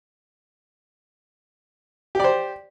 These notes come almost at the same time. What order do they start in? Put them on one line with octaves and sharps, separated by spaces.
G4 D5 C5